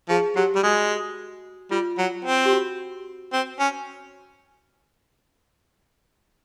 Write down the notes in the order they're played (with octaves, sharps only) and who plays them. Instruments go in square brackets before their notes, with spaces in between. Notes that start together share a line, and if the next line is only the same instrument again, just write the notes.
[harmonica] F3 [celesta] G#4
[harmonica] F#3 [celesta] G4
[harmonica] G3
[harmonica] G#3 [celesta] F#4
[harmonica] G3 [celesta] F4
[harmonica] F#3
C4
[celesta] G4
F#4
[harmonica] C4
C#4